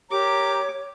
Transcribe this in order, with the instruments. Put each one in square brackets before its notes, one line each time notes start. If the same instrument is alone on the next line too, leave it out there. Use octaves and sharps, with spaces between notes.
[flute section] G4 A#4 A#5 [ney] C#5 [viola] D6